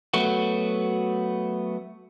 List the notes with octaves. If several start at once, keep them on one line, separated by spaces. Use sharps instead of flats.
F#3 A3 B3 F#4